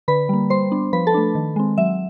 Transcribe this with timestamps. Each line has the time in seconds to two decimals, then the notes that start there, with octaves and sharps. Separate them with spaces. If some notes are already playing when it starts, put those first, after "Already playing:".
0.08 D3 B4 B5
0.29 G3 A#3
0.50 G3 C5 C6
0.72 B3 D4
0.93 F3 B4 B5
1.07 A4 A5
1.14 A3 D4
1.35 D#3
1.56 G#3 C4
1.78 F#3 E5